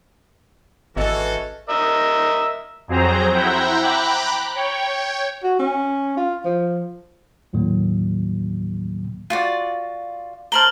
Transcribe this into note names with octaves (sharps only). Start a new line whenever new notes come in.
G#1 E3 C#4 F#4 G#4 A4 D#5
A#4 D#5 E5
F2 F#3 C4 G#4 C5 A#5
E4 C5 E5 F#5 G5 A#5
G5 A#5 B5 D6 F#6
C#5 G5
F#4
C#4
F4
F3
D#2 A2 D#3 F#3 A#3
F4 F#4 D5
A#4 C5 A5 F6 F#7 G7